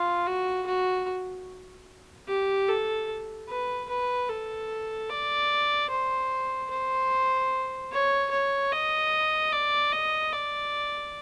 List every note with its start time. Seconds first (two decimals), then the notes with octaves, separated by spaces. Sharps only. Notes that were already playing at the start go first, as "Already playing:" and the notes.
Already playing: F4
0.27 F#4
0.67 F#4
2.28 G4
2.68 A4
3.49 B4
3.89 B4
4.29 A4
5.10 D5
5.90 C5
6.70 C5
7.92 C#5
8.31 C#5
8.72 D#5
9.52 D5
9.92 D#5
10.33 D5